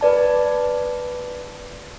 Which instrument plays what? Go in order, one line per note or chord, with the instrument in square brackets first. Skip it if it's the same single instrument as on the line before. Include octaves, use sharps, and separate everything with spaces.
[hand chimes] B4 D5 A5